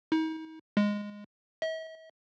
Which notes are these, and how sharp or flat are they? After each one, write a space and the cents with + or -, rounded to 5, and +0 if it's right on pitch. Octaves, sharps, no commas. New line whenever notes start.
D#4 +40
G#3 -10
E5 -45